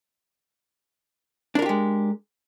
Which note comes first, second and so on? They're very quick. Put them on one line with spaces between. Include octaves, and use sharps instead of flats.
D4 A#4 F4 G4 G#3